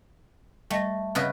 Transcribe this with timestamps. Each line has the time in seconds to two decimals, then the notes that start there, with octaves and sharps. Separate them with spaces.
0.70 G3 A3 D#5 A#6
1.15 C#3 B4 D#5 F#5